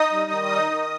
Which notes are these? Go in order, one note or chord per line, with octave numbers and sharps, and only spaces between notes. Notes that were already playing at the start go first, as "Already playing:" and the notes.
Already playing: D#4 D#5 D#6
G3
D#3
D#4
D#3